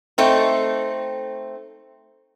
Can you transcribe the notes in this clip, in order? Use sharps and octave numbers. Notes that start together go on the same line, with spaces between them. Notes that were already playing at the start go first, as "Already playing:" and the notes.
A3 C4 D#4